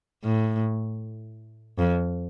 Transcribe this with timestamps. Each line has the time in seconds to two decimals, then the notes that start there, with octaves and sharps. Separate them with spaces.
0.24 A2
1.79 F2